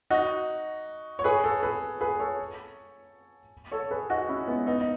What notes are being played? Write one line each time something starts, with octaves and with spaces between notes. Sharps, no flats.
D#4 F#4
C#5
G#4 B4
A4 C#5
G#4 B4
G#4 B4
A4 C#5
A4 C#5
G#4 B4
D#4 F#4
C#4 E4
G#3 B3
B3 D#4
D#4